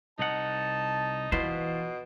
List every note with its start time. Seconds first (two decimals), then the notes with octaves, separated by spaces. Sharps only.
0.19 C2 D#4 F#5 A5
1.32 B2 E3 F4 B4 C5